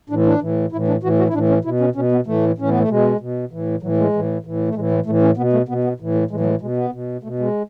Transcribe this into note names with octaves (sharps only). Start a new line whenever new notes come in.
A2 E3 D4
D4
A2 E3
A2 E3 E4
D4
A2 E3 F#4
F#4
E4
A2 E3 D4
C#4
B2 E4
C#4
B2 C#4
B3
A2 E3 A3
A2 E3 C#4
B3
A3
B2 G#3
B2
A2 E3
A2 E3 F#3
G#3
A2 E3
A2 E3
A3
A2 E3 G#3
A3
A2 E3 A3
C#4
B2 B3
A3
B2 B3
B3
A2 E3
A3
A2 E3 G#3
F#3
G#3
B2 G#3
B3
B2
B2 A3
G#3